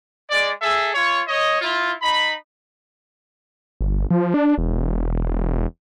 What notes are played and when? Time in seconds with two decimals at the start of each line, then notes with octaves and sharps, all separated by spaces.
0.29 G#3 D5
0.60 G#4 A4 E5
0.93 F4 C#5
1.27 C#5 D#5
1.61 E4 F4
2.00 D#4 B5
3.81 G1
4.11 F3
4.34 D4
4.58 E1